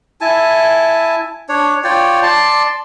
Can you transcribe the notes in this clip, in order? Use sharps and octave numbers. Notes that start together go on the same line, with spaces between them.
E4 G#5 A5
D4 C#5
F4 C#5 D5 G5
D5 A5 C6